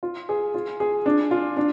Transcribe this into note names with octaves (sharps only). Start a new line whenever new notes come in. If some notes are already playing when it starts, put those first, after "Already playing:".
F4
G#4
F4
G#4
D4
F4
D4